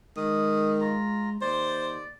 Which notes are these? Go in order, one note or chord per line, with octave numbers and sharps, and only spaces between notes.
D#3 G#3 D#6
F4 A#5
D#2 C5 D5